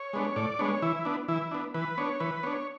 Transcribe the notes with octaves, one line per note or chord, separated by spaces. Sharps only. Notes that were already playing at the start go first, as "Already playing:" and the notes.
Already playing: C#5
G#3 B3 D4
A2 D5
G#3 B3 D4 C#5
E3 E4
B3 D4
E3 E4
B3 D4
E3 B4
B3 D4 C#5
E3 B4
B3 D4 C#5